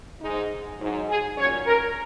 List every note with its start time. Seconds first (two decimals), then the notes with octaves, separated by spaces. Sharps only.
0.21 G#2 G#3 D#4
0.80 G#2 F#3 D#4
1.09 G#4
1.38 A#2 F#3 C#4 C#5
1.67 A#4